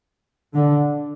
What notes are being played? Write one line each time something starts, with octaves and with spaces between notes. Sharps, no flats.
D3